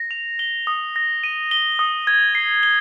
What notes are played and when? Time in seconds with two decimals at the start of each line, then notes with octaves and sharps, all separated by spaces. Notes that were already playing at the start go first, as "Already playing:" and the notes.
Already playing: A#6
0.11 F7
0.39 G7
0.67 D#6
0.96 A#6
1.24 D#7
1.51 G7
1.79 D#6
2.07 G#6
2.35 C7
2.63 G7